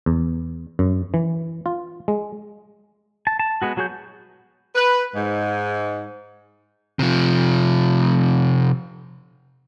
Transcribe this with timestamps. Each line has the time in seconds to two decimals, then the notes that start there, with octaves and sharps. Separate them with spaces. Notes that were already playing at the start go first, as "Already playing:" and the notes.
0.06 E2
0.79 F#2
1.14 E3
1.66 F4
2.08 G#3
3.27 A5
3.39 A5
3.62 G#3 B3 F#4
3.77 F#3 F#4 G#4 C#5 G6
4.75 B4
5.14 G#2
6.99 C3 F3